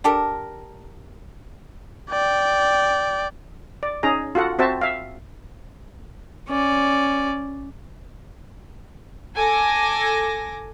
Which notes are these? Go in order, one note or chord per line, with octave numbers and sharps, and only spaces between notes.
D4 G4 A4 A#4
D5 G5
D5
C#4 D#4 G#4 A#5
F4 F#4 A4 F#5
C4 F#4 C5 E5 A5
E5 F5
C#4 D5
A4 G#5 D6 A#6